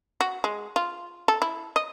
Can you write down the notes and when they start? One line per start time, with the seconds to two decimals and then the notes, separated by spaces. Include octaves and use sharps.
0.21 F#4
0.44 G#3
0.76 F4
1.28 A4
1.42 E4
1.76 D#5